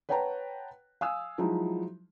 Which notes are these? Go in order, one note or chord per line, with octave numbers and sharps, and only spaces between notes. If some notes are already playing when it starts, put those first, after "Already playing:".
B4 C#5 F#5 G5 A5 A#5
F5 G#5 D#6 E6
F3 F#3 G#3 D#4 E4